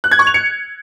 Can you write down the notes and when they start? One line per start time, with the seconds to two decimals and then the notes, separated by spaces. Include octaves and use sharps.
0.04 F#6
0.11 G#6
0.19 C#6
0.27 F7
0.34 C#7